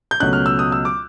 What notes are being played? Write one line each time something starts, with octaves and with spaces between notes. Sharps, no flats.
G6
C#2 B2 F#3 A3 C#4 F#6
F6
E6
D#6
E6
D6